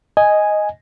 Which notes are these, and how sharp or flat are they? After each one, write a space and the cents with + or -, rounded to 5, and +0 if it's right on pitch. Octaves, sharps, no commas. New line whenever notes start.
D#5 +0 G#5 +0